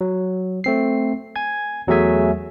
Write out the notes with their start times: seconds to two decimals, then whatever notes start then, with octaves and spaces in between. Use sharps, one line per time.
0.01 F#3
0.64 A3 C4 C7
1.36 G#5 G#6
1.87 E2 F#3 A3 G#4 E5 G#5